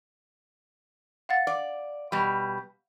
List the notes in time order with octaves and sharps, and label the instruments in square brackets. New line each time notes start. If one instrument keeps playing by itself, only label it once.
[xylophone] F5 F#5 A6
[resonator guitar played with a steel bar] D5
B2 G3